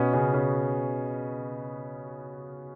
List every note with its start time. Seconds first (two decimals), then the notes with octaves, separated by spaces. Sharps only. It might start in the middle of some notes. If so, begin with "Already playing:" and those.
Already playing: B2 B3 C#4
0.13 C#3 C#4
0.33 C#3 C#4